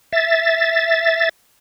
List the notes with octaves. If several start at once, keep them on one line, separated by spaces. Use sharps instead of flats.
E5 A6